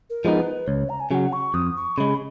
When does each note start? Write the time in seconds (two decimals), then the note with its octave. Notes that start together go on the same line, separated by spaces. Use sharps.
0.10 A#4
0.25 F3 G#3 B3 D#4
0.39 B4
0.67 C#2 C#5
0.89 A#5
1.00 G#5
1.11 C#3 F#3 F#5 G#5
1.33 C#6
1.54 F2 D#6
1.76 C#6
1.98 C#3 G#3 B5